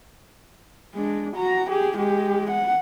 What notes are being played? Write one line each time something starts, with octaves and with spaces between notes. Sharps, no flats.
G#3 D4
F#4 A#5
G4 G#4
G#3 G4
F#5